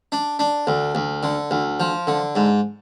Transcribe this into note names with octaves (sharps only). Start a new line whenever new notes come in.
D4
D4
D2
D2
D3
D2
F3
D3
G#2